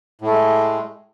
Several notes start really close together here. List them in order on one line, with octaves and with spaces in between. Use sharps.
A2 A3 G#3